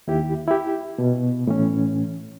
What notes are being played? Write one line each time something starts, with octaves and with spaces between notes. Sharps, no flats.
D#2 E4 G4
E4 G4
B2
A2 E3 C#4